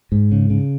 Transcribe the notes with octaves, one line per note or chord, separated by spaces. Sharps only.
G#2
C#3
C#3